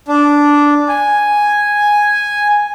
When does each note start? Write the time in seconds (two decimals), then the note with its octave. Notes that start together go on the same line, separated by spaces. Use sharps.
0.08 D4
0.88 G#5